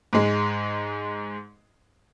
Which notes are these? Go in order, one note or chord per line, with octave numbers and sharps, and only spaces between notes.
G#2 G#3